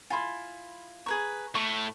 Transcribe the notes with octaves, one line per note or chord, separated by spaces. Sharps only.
E4 F4 G#5 B5 C6
G#4 B4 A#5 C#6
A2 C#6